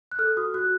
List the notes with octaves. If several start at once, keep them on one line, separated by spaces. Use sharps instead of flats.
F#6
A4 F6
F#4 D#6
F#4 F#6